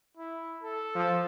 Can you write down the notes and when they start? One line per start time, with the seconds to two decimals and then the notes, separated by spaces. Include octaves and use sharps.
0.17 E4
0.63 A4
0.95 F3